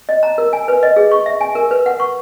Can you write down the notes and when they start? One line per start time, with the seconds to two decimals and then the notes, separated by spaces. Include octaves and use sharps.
0.09 D#5
0.23 A#5
0.38 A#4
0.53 G#5
0.68 B4
0.83 D#5
0.96 G#4
1.11 C#6
1.26 E5
1.41 G#5
1.55 A#4
1.71 B4
1.86 F#5
2.00 C#6